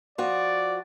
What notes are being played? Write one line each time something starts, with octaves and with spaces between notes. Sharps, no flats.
F3 F#4 D5